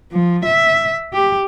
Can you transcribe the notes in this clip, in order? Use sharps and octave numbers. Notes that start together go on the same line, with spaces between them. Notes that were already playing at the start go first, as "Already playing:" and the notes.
F3
E5
G4